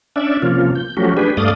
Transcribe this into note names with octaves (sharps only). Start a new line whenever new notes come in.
C#4 D4 D5 E5
C3 F3 A#3 C#4 F4
G6
F3 F#3 A3 C#4 F#4 G4
D4 G4 G#4 B4
G2 A3 D5 F5 D#6